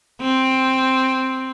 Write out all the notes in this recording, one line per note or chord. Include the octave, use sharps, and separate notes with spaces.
C4